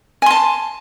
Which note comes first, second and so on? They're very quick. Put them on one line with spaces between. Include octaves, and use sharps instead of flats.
G#5 C6 A5